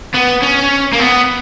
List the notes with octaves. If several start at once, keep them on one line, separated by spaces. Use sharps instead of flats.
B3
C#4
A#3
B3